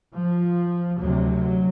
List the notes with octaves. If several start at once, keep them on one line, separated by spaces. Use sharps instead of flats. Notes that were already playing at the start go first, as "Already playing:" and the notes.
F3
D2 C3 F#3